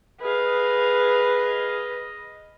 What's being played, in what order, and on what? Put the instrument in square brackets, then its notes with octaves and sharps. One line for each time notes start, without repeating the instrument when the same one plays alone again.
[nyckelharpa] G#4 F5 [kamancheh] B4 [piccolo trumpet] D#5